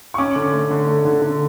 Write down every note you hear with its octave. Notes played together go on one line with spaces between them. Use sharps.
C#6
C#4 D6
D3
A3
D3
A3
D3
D3